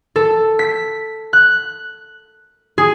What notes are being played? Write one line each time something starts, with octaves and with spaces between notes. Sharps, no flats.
A4
B6
F#6
G#4